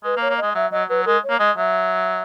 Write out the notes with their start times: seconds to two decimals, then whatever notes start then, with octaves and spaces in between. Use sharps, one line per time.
0.04 G#3 B4
0.17 A#3
0.22 C#5
0.30 A#3
0.38 G#3 D#5
0.55 F#3 E5
0.71 F#3 D#5
0.89 F#3 B4
1.06 G#3 A#4
1.23 C#5
1.30 A#3
1.39 G#3 D#5
1.56 F#3 E5